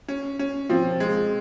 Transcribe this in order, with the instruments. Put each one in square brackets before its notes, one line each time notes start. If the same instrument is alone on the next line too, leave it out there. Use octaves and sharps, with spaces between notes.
[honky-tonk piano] C#4
C#4
[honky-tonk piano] F3 [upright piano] C4
[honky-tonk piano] G#3